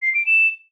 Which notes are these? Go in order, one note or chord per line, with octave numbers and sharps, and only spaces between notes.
C7
D7
E7